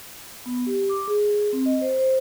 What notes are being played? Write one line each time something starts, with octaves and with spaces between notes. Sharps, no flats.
B3
G4
D6
G#4
G#4
C4
D#5
C5
C5